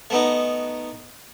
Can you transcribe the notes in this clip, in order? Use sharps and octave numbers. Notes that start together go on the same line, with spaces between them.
A3 B3 D#4